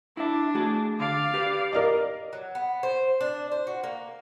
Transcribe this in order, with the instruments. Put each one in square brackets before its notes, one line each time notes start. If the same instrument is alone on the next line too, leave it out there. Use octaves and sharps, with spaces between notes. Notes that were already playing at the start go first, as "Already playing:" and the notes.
[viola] D4 [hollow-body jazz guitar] E4 E5
[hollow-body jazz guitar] A3 F#4 G#4
[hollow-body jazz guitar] D3 [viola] D5 F5
[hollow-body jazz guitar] G4 B4
[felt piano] A#4 D5 D#5
[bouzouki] F#3
B3
C5
D4
C5
F#4
A#3